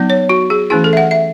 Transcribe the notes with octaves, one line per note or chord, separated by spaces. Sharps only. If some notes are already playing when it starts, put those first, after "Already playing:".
Already playing: F#3 B3 D#4
C#5
F#4
G#4
E3 A3 C#4 E4 G#4
A4
E5
F#5
E5